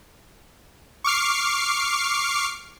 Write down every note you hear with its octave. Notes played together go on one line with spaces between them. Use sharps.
C#6 D6 F6 C7